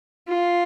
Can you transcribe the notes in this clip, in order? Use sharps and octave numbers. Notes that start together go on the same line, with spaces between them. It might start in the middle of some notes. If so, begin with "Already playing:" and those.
F4